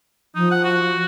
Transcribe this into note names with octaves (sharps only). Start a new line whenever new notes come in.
F3 D#4
F#5
F#4